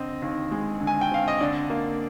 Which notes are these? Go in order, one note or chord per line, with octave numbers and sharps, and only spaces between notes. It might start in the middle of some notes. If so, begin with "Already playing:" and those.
Already playing: D3 C4 D#5
D#2
G#3
D3
G#5
G5
C4 F5
D#5
D3 D5
A#3